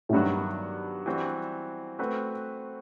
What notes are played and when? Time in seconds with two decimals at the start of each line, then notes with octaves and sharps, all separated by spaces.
0.09 A2
0.13 G2 D#3 F#3 B3 F#4
1.06 E3 G3 C4 F#4
1.99 A3 C4 F#4 B4